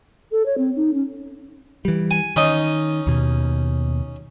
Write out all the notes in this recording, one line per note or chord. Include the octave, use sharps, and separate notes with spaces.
A4
C#5
C4
D#4
C#4
E3 G3
G#5
D#3 C#4 D#4 D#5
D#2 B2